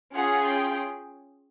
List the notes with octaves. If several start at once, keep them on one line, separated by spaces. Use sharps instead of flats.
C#4 F4 G#4 F#5
G5